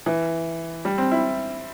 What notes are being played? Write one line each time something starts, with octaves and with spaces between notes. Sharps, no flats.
E3
G3
C4
E4